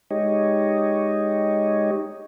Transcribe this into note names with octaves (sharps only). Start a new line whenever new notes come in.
G#3 D#4 G4 C#5 D#5